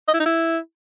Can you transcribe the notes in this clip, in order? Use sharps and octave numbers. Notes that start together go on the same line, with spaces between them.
D#5
E4
D#4
E4